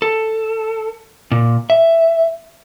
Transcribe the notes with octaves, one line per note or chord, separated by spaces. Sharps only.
A4
A#2
E5